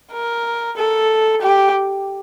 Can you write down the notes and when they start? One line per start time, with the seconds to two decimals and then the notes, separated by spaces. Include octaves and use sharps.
0.12 A#4
0.77 A4
1.41 G4